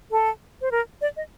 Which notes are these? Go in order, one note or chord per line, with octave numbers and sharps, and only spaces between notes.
A4
C5
A#4
D5
D#5